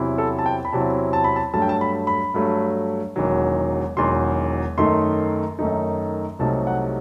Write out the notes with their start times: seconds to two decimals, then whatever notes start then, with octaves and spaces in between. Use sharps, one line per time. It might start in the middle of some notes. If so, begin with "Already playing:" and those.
Already playing: E2 C3 F#3 C4 E4
0.18 A4
0.39 A5
0.46 G5
0.65 B5
0.73 E2 C3 F#3 C4 E4 A5
1.13 A5
1.24 B5
1.36 A5
1.53 G2 F#3 A3 A5
1.62 G5
1.69 A5
1.81 B5
2.07 B5
2.34 G2 F#3 A3
3.16 E1 E2 D#3 F#3
3.97 E1 E2 D#3 F#3 C6
4.78 F#2 D#3 A3 D#4 C6
5.59 F#2 D#3 A3 D#4
6.39 C2 C3 F#3 A3 D#4 A5
6.67 F#5